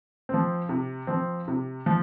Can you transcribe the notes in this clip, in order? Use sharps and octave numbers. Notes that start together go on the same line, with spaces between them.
F3 C4
C3
F3 C4
C3
F3